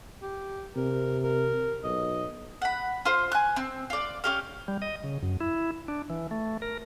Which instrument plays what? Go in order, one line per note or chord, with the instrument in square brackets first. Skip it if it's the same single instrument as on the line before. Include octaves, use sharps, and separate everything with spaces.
[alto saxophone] G4
[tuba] C3 [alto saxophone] A#4
[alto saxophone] A#4
[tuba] B1 [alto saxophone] D#5
[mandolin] F#5 B5
F4 C5
G#5 F#6
C4
F4 D5
C#4 G4 F5
[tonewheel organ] G3
D#5
C#3
F#2
E4
D4
E3
A3
A#4